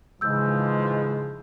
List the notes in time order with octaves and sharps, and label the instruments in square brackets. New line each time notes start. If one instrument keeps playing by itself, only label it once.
[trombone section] G#2 E3 F3 [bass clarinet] C#3 [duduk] G#3 [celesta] E6 G6